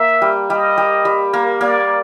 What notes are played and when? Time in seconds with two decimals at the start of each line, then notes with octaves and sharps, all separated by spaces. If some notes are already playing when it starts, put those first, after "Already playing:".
Already playing: A#3 E5
0.22 G3
0.50 G3 D#5
0.78 G3
1.05 G3
1.33 A#3
1.61 A#3 D5